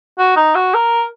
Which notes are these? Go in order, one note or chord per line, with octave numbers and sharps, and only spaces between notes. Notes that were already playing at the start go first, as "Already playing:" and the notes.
F#4
D#4
F#4
A#4